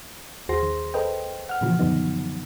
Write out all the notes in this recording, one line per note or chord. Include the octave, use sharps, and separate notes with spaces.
D#2 F#4 G#4 C5 C6 A#6
D#3
A4 B4 C5 D#5 G5
F#5 F6
A#2 C#3 E3 F3 F#4
F#2 D3 F#3 B3 D#4